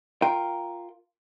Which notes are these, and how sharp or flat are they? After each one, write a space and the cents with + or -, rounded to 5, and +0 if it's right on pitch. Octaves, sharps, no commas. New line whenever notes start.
F4 +0 A#4 +0 G5 +0